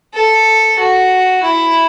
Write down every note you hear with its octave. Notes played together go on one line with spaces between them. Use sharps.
A4
F#4
E4